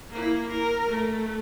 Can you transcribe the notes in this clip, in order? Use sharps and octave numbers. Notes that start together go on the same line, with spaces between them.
A#3 E4
A#4
A3